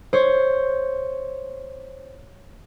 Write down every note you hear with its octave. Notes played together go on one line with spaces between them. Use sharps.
C5 C#5